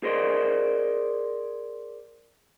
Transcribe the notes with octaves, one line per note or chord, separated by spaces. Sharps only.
G#4 A#4 C5 D5 D#5